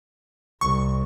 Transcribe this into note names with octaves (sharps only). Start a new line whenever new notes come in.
C2 C#6